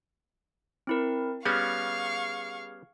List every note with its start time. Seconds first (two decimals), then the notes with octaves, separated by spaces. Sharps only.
0.87 C4 E4 A#4
1.45 G3 B3 C#4 G#4 F5 C#6 F6 G#6